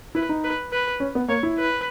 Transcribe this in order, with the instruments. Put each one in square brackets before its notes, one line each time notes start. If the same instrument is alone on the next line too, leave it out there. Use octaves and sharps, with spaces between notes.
[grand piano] E4 [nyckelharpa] B4
[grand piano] D#4
[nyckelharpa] B4
B4
[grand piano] C#4
B3
[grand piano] A#3 [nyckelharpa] C#5
[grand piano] E4
[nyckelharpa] B4